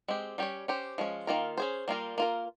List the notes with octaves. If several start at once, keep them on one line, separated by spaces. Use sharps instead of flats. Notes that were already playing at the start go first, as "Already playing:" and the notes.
G#3 C4 G4
G3 C#4 G4 C#5
C#4 G4 C5
F3 G#3 C#4
D#3 A#3 F4 A#4
C#4 G#4 C5
G3 A#3 F4 A#4
A#3 F4 A#4